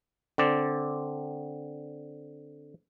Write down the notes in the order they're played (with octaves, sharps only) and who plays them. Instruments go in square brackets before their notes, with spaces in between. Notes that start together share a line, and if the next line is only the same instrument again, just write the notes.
[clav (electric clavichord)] D3 C4 D5